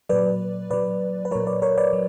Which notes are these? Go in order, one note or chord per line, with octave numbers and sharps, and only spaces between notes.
A#2 F#3 B4 D5
A#2 F#3 B4 D5
B4
A#2 F#3 A#4 C#5
B4 D5
A#4 C#5
B4 D5
F#3